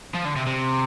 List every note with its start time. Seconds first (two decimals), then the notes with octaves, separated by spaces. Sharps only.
0.14 F3
0.25 D3
0.36 C3
0.46 C3